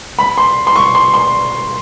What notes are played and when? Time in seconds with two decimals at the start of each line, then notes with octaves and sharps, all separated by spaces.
0.19 B5
0.38 C6
0.67 C6
0.76 C#6
0.95 C6
1.14 C6